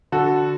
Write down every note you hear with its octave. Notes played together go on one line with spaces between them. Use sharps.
D3 F#4 A4